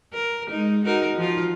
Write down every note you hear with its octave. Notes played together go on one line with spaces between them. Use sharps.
A#4
G#3 D#4
D#4 F#4 A#4
F3 F4